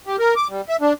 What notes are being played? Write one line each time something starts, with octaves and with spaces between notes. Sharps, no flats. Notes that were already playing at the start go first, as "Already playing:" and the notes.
G4
A#4
D6
G3
E5
D4